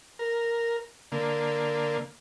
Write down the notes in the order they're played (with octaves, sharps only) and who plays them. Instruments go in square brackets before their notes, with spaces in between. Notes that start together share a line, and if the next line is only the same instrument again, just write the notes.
[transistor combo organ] A#4
D3 A#3